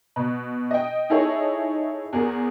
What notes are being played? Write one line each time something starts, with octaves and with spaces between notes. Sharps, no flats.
B2
D#5 G5
D#4 E4 G#4 A4 C#5
E2 G#4 A#4